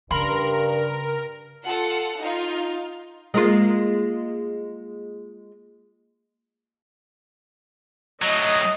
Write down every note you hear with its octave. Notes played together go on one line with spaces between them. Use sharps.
G2 C#3 A#4 B5 C6
F4 A4 F#5
D#4 F4
G#3 A#3 F4
A2 F#3 D#5